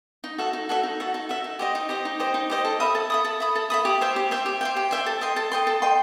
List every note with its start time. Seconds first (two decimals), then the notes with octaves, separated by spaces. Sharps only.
0.24 D#4
0.38 F#4 A4 E5
0.53 D#4
0.69 F#4 A4 E5
0.83 D#4
1.00 F#4 A4 E5
1.14 D#4
1.29 F#4 A4 E5
1.44 D#4
1.59 G4 C5 D#5
1.75 D#4
1.89 G4 C5 D#5
2.05 D#4
2.20 G4 C5 D#5
2.34 D#4
2.50 G4 C5 D#5
2.65 A4
2.80 E5 B5 D#6
2.95 A4
3.10 E5 B5 D#6
3.25 A4
3.40 E5 B5 D#6
3.55 A4
3.70 E5 B5 D#6
3.85 G4
4.01 C5 E5 G5
4.16 G4
4.31 C5 E5 G5
4.46 G4
4.61 C5 E5 G5
4.77 G4
4.91 C5 E5 G5
5.06 A4
5.21 D#5 G5 C6
5.36 A4
5.52 D#5 G5 C6
5.67 A4
5.82 D#5 G5 C6